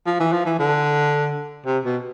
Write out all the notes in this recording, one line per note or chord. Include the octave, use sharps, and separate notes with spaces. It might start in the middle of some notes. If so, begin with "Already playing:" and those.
F3
E3
F3
E3
D3
C3
B2